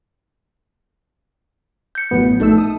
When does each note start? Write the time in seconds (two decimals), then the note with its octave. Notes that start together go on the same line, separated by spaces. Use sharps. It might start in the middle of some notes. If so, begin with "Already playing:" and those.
1.95 G6 C#7
2.11 A1 F#2 B3
2.40 A#1 A3 D#4 A4 E6
2.58 D#6